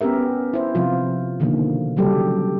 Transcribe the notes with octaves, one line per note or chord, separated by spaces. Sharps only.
B3 C#4 G4 A#4 E5
E4 C5
C3 F3 F4
B2 D3 D#3 F3 A#3
C#3 F#3 G3 G4 A4